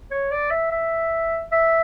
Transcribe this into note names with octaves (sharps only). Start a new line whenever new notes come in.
C#5
D5
E5
E5
E5